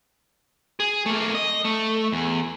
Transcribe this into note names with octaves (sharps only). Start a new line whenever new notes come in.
G#4
A3 A#3
D#5
A3
E2